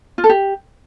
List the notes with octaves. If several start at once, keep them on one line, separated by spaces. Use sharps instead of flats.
F4
A4
G4